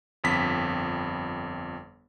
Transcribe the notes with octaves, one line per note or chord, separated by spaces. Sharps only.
G1 F2 B6